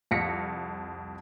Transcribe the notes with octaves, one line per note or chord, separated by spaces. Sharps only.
C2 F2 F5 A#6 B6 C#7